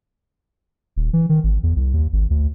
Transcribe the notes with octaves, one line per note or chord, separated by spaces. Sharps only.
D#1
E3
D#3
G#1
E2
C2
D#2
G#1
D2